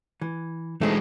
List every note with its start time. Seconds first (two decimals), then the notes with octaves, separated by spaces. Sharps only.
0.21 E3
0.81 E3 G#3 A3 C4 D#4